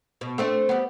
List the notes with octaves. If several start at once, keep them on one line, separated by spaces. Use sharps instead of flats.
B2
A3 C4 D4
G3 B3